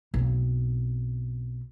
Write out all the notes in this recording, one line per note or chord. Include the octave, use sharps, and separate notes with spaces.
B1 C4